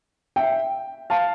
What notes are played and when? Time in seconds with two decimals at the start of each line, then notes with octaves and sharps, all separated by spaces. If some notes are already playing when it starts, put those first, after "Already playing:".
0.36 E5 G5
1.10 F5 A5